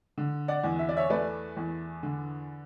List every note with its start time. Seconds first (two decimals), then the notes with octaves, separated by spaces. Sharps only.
0.18 D3
0.48 D5 F#5
0.64 E2
0.79 E5
0.89 D5
0.97 C#5 E5
1.10 A3 B4 D5
1.57 E2
2.03 D3